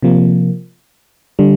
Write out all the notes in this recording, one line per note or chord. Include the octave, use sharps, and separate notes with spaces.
C3 F3 A#3
D3 G3